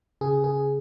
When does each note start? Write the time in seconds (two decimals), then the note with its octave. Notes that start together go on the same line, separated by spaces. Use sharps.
0.21 C#3 G#4
0.44 C#3 G#4